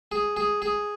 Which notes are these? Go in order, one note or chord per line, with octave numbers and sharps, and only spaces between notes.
G#4
G#4
G#4